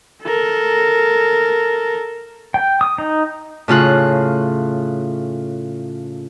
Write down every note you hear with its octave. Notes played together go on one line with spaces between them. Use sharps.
A4 A#4
G5
D#6
D#4
A2 C#3 F4 F#6